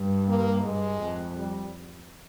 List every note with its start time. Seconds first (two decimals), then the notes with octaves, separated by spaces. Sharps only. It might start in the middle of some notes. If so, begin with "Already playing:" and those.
Already playing: G2
0.28 A#3
0.64 G2 G#3
1.01 F2
1.38 G3